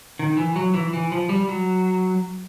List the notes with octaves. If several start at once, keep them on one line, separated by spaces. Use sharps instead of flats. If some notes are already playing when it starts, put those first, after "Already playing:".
D#3
E3
F#3
E3
E3
F3
G3
F#3